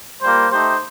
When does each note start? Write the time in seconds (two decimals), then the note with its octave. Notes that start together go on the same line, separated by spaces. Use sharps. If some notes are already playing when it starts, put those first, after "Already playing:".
0.23 G3 A#3 F4 C5
0.52 A3 D#4 G4 C5